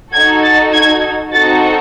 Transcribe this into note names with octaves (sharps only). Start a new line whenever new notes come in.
D#4 F#4 A4 G#6
A6
G#6
C4 D#4 F#4 A4 A6